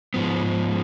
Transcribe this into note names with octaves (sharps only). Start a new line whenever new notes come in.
G#2 F3 B3